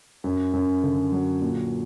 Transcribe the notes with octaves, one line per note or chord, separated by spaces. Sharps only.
F#2
F#2
D3
F#3
A#2